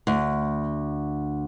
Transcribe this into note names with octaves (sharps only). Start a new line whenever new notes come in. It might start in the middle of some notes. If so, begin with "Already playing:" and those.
D2